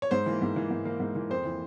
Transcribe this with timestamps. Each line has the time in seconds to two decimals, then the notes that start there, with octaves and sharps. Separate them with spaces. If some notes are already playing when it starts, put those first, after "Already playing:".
0.02 C#5
0.11 G#2 C5
0.26 E3 A#3
0.42 G#2
0.56 E3 A#3
0.71 G#2
0.85 E3 A#3
1.00 G#2
1.15 E3 A#3
1.30 F2 C5
1.45 E3 A#3